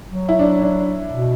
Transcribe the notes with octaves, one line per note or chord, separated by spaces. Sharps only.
F#3
E4
D4
D4
B2